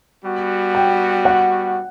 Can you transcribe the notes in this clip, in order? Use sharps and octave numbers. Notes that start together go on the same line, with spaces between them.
G3 B3 F#4
G5
F#5